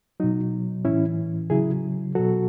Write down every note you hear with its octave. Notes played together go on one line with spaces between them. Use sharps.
B2 F#3 D#4
A2 E3 C#4 E4
C#3 F#3 E4 G#4
B2 F#3 F#4 A4